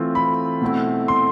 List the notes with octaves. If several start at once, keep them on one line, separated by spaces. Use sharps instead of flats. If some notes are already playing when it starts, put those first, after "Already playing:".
Already playing: E3 A3 C4 F4
B5
B2 A3 C4 E4
C6